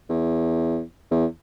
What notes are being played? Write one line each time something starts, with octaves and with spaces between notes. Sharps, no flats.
E2
E2